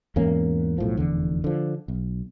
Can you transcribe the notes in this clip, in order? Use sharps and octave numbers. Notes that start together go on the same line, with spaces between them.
E2 G#2 A#3 C#4
B1 A2 F3
F1 E2 D3
D3 F3
B1